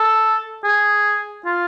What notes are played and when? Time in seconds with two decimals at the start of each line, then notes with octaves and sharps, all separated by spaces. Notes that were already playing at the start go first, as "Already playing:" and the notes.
Already playing: A4
0.64 G#4
1.45 F4